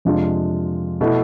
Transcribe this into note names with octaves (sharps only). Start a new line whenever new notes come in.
F2 C3 G#3 D4 F4
B2 A3 E4